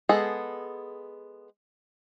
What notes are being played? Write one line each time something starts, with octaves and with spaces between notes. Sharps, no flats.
G#3 B3 G#4 A4